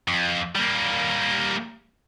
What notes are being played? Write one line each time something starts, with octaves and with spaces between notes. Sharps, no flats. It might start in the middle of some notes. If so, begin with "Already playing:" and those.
F2
G3 A#3